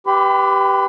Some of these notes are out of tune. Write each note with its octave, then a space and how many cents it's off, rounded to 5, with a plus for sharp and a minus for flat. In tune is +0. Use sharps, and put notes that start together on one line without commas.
G4 +0 B4 +0 B5 +40